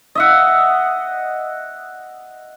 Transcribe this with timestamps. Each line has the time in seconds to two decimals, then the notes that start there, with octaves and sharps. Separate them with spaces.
0.15 D#5 E5 F#5